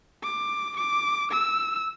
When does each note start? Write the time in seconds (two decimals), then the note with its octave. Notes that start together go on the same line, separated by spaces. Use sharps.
0.23 D6
0.77 D6
1.31 E6